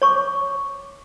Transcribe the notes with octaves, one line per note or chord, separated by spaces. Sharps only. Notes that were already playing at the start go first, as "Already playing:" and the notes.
C#5 C#6 D6